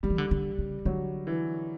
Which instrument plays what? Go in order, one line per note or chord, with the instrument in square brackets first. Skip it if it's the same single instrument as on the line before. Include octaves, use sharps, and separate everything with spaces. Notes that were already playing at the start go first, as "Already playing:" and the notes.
[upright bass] D3 [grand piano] G3
[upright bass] E3
D3
D3
C#3
[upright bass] D3 [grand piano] F#3
[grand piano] E3